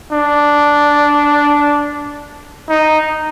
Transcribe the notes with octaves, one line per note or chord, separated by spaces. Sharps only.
D4
D#4